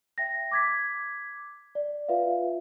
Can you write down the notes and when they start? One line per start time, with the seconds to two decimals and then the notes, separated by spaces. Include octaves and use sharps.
0.18 E5 G5 A#6
0.52 D6 G#6 B6
1.75 D5
2.08 F4 B4 E5 F5